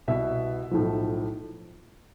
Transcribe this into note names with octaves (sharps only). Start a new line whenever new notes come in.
C2 B2 B3 E5
B1 A2 F3